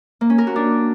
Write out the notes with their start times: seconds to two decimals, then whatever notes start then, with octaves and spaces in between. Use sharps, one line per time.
0.21 A#3
0.30 C#4
0.38 A#4
0.47 F#4
0.56 D4